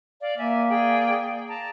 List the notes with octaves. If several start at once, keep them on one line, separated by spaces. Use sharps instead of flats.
D5 F5
A#3 E5 G#5
G#4 D5 G5
A5 A#5